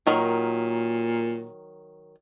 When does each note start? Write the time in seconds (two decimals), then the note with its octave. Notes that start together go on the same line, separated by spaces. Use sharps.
0.07 A#2 D#3 F#3